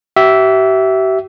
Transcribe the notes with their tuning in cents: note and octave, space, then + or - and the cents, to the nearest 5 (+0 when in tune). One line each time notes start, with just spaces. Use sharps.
G4 -40 E5 +0